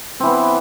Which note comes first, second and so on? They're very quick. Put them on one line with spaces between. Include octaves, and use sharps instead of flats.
C4 E3 B3